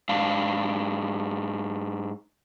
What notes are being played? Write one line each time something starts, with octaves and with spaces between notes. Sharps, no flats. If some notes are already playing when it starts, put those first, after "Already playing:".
G#2 D4 F5